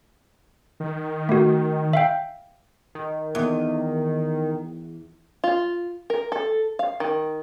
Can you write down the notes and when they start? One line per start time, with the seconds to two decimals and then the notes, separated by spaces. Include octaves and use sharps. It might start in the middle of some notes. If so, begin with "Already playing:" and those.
0.80 D#3
1.29 A3 F#4
1.93 E5 F5 G5
2.95 D#3
3.35 E2
5.44 F4
6.10 A#4
6.32 A4
6.79 F5
7.00 D#3